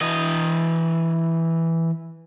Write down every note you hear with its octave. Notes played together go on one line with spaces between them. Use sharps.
E3 D#5